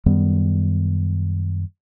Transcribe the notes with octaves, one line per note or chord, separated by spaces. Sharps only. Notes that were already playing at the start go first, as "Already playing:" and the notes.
F#2 D#3 G3 B3